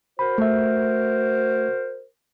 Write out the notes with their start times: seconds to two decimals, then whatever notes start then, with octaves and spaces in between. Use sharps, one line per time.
0.19 F#4 A#4 C5 B5
0.38 A3 E5